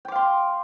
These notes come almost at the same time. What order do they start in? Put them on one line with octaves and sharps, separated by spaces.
G5 D6 F5 C6